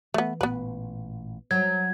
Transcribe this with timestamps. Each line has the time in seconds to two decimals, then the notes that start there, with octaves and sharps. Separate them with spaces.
0.14 E3 A3 B3
0.41 A1 A#2 B3 B4
1.51 F#3 G#6